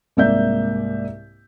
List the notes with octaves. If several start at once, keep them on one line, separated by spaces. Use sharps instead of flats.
C2 G#2 A#3 D5 E5 G6